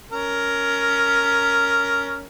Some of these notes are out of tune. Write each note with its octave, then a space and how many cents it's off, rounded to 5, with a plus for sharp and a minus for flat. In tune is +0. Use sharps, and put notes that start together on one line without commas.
C#4 +15 A#4 +0